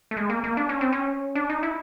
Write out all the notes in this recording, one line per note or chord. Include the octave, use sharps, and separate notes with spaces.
A3
G#3
A#3
A#3
D4
C#4
C4
C#4
D4
D#4
E4